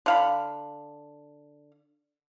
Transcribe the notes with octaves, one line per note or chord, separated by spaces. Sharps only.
D3 F5 B5